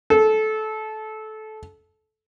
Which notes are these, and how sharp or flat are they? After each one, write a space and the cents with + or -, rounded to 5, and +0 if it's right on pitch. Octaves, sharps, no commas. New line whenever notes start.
A4 -20